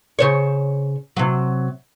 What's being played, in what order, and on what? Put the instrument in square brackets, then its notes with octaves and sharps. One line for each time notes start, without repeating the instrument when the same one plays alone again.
[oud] C#3 C5 C#5
C3 F#3